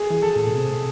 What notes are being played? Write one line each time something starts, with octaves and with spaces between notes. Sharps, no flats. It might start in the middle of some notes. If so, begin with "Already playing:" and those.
Already playing: G#4
E3
A4
A2
B2
C3